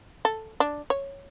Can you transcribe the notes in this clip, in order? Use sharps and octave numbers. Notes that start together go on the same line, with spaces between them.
A4
D4
C#5